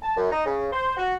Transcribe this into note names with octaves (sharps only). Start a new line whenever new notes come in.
A5
F#2
D#4
C#3
C5
F#4